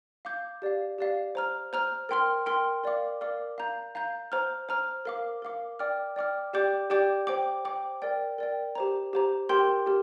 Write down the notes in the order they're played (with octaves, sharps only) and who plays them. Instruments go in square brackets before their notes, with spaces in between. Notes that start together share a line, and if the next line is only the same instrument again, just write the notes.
[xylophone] F5 D6 G6
G4 D5 F5
G4 D5 F5
C5 A#5 F6
C5 A#5 F6
A#4 G5 C6 F6
A#4 G5 C6 F6
A#4 D5 F5 D6
A#4 D5 F5 D6
F5 A#5 G6
F5 A#5 G6
C5 A#5 F6
C5 A#5 F6
A#4 F5 D6
A#4 F5 D6
D5 G5 D6 F6
D5 G5 D6 F6
G4 D5 G5 D6 G6
G4 D5 G5 D6 G6
C5 G5 D6
C5 G5 D6
A#4 D5 G5
A#4 D5 G5
G4 C5 A#5
G4 C5 A#5
G4 A#4 G5 C6 G6
G4 A#4